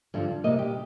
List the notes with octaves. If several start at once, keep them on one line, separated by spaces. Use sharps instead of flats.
G2 D3 F3
C3 G3 A#3 D#5
G4